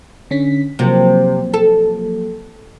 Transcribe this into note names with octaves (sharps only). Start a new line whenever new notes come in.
D3 C#4 B6
C3 F3 F#3 A#3
A4